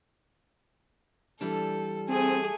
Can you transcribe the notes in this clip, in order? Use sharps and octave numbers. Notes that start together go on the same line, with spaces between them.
E3 G3 D4 A4
A3 C4 G#4 G#5